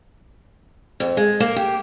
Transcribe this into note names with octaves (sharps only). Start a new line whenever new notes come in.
F2
G#3
A#3
G4